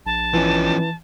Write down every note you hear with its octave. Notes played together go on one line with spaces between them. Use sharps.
A#1 A5
E3 F3 C#4